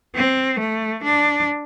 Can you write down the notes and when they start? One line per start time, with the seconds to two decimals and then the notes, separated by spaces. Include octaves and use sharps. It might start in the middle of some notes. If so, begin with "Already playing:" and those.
0.16 C4
0.60 A3
1.04 D4